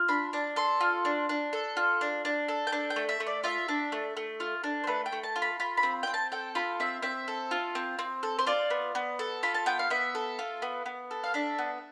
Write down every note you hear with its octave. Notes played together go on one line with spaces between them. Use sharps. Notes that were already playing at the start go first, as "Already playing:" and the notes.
Already playing: F4
D4 B5
D4 A5
A4 C6
F4
D4
D4
A4
F4
D4
D4
A4
G5
D4 A5
G5
A3
E5
A3
D5
F4 E5
D4
A3
A3
F4
D4
C5
A3 B4
G5
A3
A5
F4
B5
F4 B5
B5
C4
C4 G5
A5
A4 G5
F4 B5
C4 E5
C4 E5
A4
F4
C4
C4
A4
C5
F4 D5
B3
B3
A4
F4 B5
A5
B3 G5
F5
B3 E5
A4
F4
B3
B3
A4
F5
D4 E5
B3